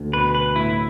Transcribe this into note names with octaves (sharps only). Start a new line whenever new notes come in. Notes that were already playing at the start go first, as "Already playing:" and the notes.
Already playing: D2 D3
B2 B4
B4
A2 E4